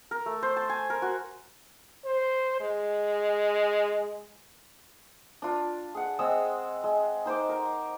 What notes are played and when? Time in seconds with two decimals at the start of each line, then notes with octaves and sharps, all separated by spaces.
0.11 A#4
0.26 A3
0.43 C5
0.57 A5
0.70 G#5
0.90 A#4
1.02 F#4
2.05 C5
2.61 G#3
5.42 D4 F4
5.95 G#4 F#5
6.19 G#3 C4 D#6 E6
6.84 G#3
7.26 D#4 C5 C6 D6
7.49 A#4